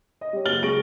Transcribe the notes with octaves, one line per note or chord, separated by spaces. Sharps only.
D#5
G3 C#5
F#1 F#4 F6 A6 F#7 G7
C#2 G#4 C#6 A#6 D7